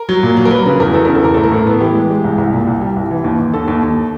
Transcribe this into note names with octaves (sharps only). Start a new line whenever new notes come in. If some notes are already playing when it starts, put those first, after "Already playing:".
Already playing: A#4
F#3
A#2
F#3
A#4
F#3 B4
C#3 B4
E2 A#4
E2 A4
C#3 A#4
A4
E2 A#4
A2 A4
A#4
A2 A4
B3
E3 G4
G#3
G#3
C2
C2
A#2
C2
G3
C2
E3
D#2
D#2
D#2 A4
D#2
D#2